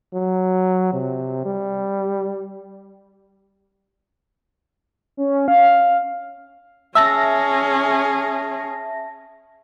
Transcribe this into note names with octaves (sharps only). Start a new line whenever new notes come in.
F#3
C3
G3
C#4
F5
C#4 G#4 E5 A5 E6 A#6